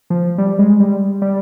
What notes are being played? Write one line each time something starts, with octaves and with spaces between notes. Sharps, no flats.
F3
G3
G#3
G3
G3